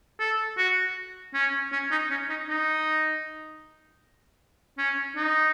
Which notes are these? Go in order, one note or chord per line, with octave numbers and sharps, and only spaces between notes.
A4
F#4
C#4
C#4
D#4
C#4
D#4
D#4
C#4
D#4